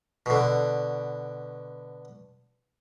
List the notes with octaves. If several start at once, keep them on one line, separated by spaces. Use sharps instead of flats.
B2 D3